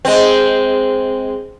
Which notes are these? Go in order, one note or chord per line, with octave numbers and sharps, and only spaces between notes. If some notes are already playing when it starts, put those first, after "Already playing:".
G#3 C4